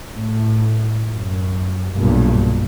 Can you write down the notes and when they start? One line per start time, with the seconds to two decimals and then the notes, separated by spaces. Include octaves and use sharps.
0.13 A2
1.10 F#2
1.95 B1 G2 A#2